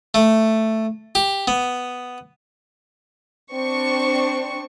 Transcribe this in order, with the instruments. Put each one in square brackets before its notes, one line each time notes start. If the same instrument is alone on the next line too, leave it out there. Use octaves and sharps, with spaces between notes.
[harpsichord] A3
G4
B3
[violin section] C4 D4 C#6